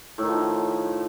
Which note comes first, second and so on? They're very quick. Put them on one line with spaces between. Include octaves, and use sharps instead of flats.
A2 D#3 F3